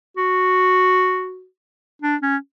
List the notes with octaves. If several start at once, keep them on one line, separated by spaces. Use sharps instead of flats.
F#4
D4
C#4